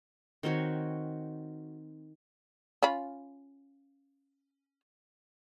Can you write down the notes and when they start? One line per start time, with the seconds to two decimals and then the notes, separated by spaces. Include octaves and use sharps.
0.43 D#3 C4 F#4 C#5
2.83 C#4 F4 B5